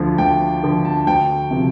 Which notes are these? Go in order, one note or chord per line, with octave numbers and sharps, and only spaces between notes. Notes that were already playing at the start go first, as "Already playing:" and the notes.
Already playing: D2 D3 F3
D2 G5
D3 F3
A5
D2 G5
C3 F3